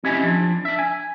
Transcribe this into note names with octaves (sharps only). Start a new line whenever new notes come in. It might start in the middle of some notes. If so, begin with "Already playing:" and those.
C4 C#4 E4 G4 D#5 G#5
F3 D4
D4 E5
G#5